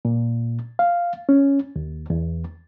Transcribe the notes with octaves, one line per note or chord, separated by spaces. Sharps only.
A#2
F5
C#4
D#2
E2